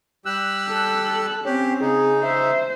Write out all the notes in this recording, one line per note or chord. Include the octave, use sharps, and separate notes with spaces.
G3 G4 E6 F#6
A4
C4 C#4 G4
C#3 D#4 G#4
C5 E5